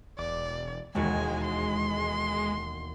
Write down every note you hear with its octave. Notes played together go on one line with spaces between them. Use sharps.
E1 D5 D6
E1 D#2 G#3 F#4 G#5
C6